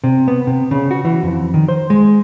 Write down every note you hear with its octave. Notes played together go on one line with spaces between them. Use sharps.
C3
B3
C3
C#3
F#4
E3
F2
D#3
C5
G#3